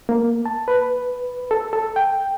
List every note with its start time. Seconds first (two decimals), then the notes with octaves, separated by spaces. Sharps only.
0.09 A#3
0.46 A5
0.68 B4
1.51 A4
1.73 A4
1.96 G5